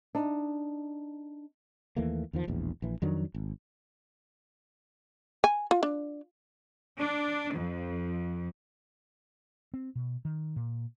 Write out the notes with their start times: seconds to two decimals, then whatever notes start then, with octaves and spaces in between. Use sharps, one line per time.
0.15 D4 D#4
1.96 D#2 E3 A3 A#3
2.33 E2 D#3 F3
2.47 E1 A#1 E2
2.82 A#1 E3
3.02 F2 D#3 F#3 D4
3.34 G#1
5.44 G#5
5.71 F4
5.83 D4
6.99 D4
7.54 F2
9.74 C4
9.95 B2
10.25 D#3
10.56 A#2